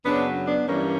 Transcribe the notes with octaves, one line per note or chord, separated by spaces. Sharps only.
F#2 C#3 F#3 B3 D4
B3 D4
G2 E3 G3 A#3 C#4